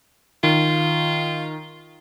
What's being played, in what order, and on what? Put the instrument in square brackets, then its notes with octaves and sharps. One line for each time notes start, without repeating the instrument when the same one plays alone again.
[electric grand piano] D#3 [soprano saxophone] F4